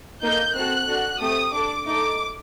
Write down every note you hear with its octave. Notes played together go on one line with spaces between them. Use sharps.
A#3 D#4 A4 G6
C4 F#4 A4 F#6
D4 F#4 A4
A3 C4 G4 D#6
D4 A4 D6
A3 D#4 A4 D6